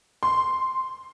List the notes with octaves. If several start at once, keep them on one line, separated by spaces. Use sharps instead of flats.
C6